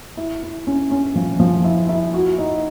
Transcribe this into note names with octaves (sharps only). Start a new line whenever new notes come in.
E4
E4
C#4
C#4
F3
F3
E4
E4
F#4
D#4